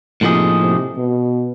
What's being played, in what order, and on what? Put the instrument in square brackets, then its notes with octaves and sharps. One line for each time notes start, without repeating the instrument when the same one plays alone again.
[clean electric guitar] A2 F3 A#3 D#4 G#4 [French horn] C3
[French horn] C3
B2